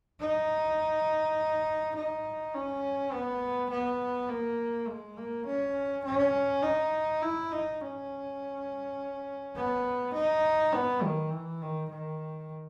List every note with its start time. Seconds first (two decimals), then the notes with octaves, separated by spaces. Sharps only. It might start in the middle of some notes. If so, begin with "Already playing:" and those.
0.20 D#4
1.96 D#4
2.54 C#4
3.12 B3
3.70 B3
4.29 A#3
4.87 G#3
5.17 A#3
5.46 C#4
6.05 C#4
6.63 D#4
7.22 E4
7.52 D#4
7.81 C#4
9.56 B3
10.14 D#4
10.73 B3
11.03 D#3
11.31 E3
11.61 D#3
11.90 D#3